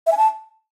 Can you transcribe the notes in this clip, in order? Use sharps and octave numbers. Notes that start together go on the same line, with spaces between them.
E5
G#5
A5